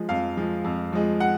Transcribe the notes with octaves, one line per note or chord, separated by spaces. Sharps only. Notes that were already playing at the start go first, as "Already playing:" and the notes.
Already playing: F3 G#3
F2 F5
F3 G#3
F2
F3 G#3
F#5